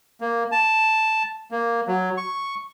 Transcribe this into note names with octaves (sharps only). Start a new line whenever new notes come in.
A#3
A5
A#3
F#3
C#6